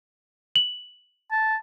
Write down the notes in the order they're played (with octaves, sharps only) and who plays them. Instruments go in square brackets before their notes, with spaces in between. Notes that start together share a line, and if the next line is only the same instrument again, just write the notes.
[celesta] F#7
[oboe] A5